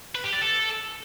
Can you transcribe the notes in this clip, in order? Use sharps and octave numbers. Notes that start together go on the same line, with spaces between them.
B4
G4
D5
A4